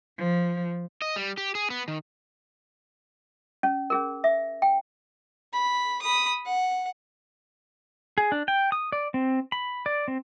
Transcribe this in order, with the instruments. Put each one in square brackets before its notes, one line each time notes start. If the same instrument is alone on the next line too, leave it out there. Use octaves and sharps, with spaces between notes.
[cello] F3
[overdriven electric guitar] D#5
G3
G4
G#4
B3
D#3
[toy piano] C#4
C#4 G#4 A#4
E5
G5
[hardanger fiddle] B5
B5 D#6
F#5
[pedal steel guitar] G#4
D4
G5
D#6
D5
C4
B5
D5
C4